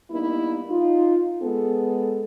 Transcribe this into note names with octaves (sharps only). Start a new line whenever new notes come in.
G3 A#3 B3 D#4 E4
D#4 F4
G#3 B3 A4